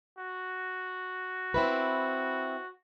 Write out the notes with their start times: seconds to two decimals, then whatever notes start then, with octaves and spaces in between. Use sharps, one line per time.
0.18 F#4
1.54 C4 E4 B4